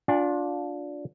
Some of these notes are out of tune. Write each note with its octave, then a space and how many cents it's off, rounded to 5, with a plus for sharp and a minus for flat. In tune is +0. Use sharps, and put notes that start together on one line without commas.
D4 -10 F4 +30 G#5 -40